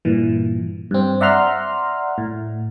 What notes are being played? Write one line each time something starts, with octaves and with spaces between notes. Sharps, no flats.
G2 A#2 E3
G2 C4
D5 E5 F#5 A#5 C6 F6
A2